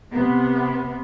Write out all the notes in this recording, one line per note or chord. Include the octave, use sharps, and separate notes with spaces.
C3 B3